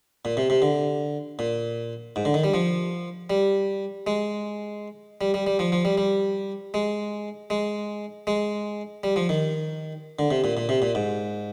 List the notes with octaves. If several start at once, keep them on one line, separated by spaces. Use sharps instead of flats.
A#2
C3
C3
D3
A#2
G#2
D3
D#3
G3
F3
G3
G#3
G3
G3
G3
F3
F3
G3
G3
G#3
G#3
G#3
G3
F3
D#3
D3
C3
A#2
A#2
C3
A#2
G#2